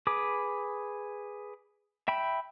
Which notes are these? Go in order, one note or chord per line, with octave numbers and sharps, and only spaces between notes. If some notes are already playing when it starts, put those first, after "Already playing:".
G#4 B4 D6
E5 G5 B5